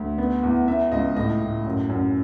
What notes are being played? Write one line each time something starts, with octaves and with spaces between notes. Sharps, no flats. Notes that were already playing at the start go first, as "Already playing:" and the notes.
Already playing: D2
B3
E2
B3 E5
C#2 D#5
A2 D#5
A2
F#2
F#2